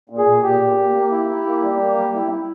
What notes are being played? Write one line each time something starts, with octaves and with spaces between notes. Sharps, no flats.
A#2
G#4
A#2
A#2 G4
A#2
A#2
A#3
E4
E4
A#3
G3
A#3
G3
E4
E4